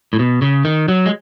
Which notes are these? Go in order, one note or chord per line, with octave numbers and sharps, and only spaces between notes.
A2
B2
C#3
D#3
F#3
G#3